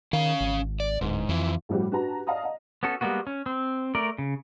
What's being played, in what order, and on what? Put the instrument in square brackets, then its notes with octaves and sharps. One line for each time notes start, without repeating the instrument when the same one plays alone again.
[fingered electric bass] D#3 [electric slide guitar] C#4 F5
[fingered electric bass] G#1
[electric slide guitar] D5
[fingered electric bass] D1 [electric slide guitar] G#2
[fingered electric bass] F2 [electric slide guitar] E3 F3
[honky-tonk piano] A2 F3 G3 F#4 G4
D4 F#4 G4 B4 A5 A#5
D5 D#5 F5 A5 A#5 D#6
D#5 F5
[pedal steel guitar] B3 C#4 F#4 A4
G3 G#3 A#3 B3 F#4
C#4
C4
A3 A#4 D5
C#3